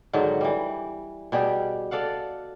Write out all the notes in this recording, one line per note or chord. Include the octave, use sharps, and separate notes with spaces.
G#2 D3 D#3 F#3
E3 G3
B2 G3 G4 G#4
A4 D5 F5 F#5